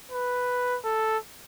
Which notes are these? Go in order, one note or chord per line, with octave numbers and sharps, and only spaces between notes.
B4
A4